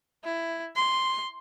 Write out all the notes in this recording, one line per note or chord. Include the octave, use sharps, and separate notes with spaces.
E4
C6